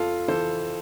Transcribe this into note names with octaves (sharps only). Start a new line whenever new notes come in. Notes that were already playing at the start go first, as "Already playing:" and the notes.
Already playing: F2 F4 A4
E3 A4 C5